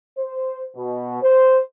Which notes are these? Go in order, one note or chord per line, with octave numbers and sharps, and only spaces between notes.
C5
B2
C5